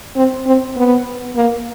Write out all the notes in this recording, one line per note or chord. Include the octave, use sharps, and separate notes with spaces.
C4
C4
B3
A#3